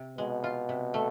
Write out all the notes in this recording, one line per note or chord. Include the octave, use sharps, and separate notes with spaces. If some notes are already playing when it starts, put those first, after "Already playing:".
Already playing: C3
B2 G#3
F4
C3
A3